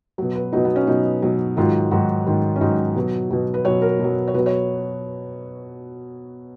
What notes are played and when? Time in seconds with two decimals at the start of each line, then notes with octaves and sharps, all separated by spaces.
0.18 B2 F#3
0.35 B4
0.53 B2 F#3 D#4
0.65 B3
0.76 C#4
0.87 B2 F#3 D#4
1.22 B2 F#3
1.57 G#2 D#3 F#3 F4
1.91 G#2 D#3 F#3 F#4
2.27 G#2 D#3 F#3
2.56 C#4
2.61 G#2 D#3 F#3 D#4
2.96 B2 F#3
3.30 B2 F#3
3.54 B4
3.65 B2 F#3 C#5
3.82 A#4
3.99 B2 F#3
4.28 C#5
4.34 B2 F#3 B4
4.46 C#5